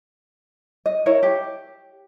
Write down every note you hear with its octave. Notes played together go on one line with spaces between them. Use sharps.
D#5
E4 A#4 C#5
G4